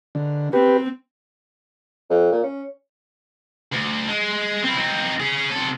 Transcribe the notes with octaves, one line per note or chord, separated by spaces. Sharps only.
D3
C4 G4 B4
F2
A#2
C#4
D2
G#3
C4 E4
C4 D#4
C#4 G#4
C3 A4